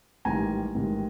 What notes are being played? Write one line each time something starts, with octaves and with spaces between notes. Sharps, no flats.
A1 G#2 D#3 G3 G#5 A#5
A1 G#2 D#3 G3